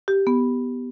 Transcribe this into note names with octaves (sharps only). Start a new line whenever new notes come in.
G4
B3